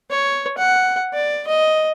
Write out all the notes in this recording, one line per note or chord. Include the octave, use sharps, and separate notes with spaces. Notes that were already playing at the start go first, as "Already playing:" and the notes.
C#5
F#5
D5
D#5